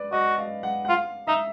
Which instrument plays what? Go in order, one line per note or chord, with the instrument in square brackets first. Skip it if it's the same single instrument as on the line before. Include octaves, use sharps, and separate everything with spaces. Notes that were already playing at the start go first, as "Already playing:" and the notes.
Already playing: [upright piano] B4 D5
[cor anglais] F#4 [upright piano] D#5
[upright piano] F5
F#5
F#5
[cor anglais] F4 [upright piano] F5
[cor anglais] D#4 [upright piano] E5